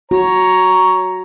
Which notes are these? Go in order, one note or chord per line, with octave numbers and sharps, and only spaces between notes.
F#4 C#5 A#5